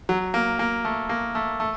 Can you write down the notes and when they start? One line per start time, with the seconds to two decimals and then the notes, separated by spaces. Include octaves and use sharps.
0.09 F#3
0.34 A#3
0.59 A#3
0.85 A3
1.09 A#3
1.35 A3
1.60 A3